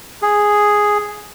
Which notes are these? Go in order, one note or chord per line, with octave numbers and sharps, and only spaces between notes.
G#4